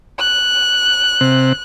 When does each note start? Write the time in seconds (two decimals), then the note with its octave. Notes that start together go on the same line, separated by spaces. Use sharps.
0.19 F#6
1.21 C3